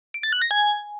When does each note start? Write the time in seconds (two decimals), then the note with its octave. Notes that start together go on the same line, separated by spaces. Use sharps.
0.14 D7
0.23 A6
0.32 F#6
0.42 A#6
0.51 G#5